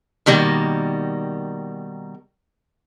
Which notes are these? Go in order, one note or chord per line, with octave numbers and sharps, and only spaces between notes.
B2 D#3 G3 A#3